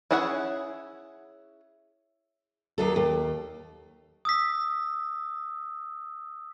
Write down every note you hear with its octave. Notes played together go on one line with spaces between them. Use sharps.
C#4 E4 G#4 C#5 F#5
D#2 F#3 A4
D#2
D#6 E6 B6